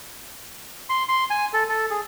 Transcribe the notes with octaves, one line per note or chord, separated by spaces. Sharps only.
C6
C6
G#5
A4
A4
G#4